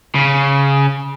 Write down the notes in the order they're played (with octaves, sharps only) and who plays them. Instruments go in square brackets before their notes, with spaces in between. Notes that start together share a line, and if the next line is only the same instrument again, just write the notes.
[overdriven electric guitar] C#3